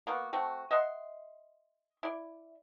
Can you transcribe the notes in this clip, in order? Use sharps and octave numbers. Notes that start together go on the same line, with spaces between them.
A#3 B3 F#4
A3 C4 F#4
D#5 E5 F#5 C6
E4 D5